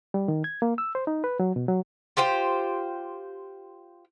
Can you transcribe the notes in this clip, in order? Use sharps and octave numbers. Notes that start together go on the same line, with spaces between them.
G3
D#3
G#6
A#3
E6
C5
D#4
B4
F#3
B2
F#3
F4 G4 C5 G5